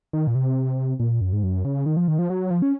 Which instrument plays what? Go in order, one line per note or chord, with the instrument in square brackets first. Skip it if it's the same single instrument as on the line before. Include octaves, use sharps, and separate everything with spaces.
[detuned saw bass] D#3
A#2
C3
A#2
F#2
G#2
F#2
C#3
D#3
F3
D#3
F3
F#3
F3
C#4